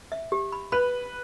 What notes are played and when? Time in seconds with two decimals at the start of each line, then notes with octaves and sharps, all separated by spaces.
0.12 E5
0.32 G4
0.52 B5
0.72 B4 B5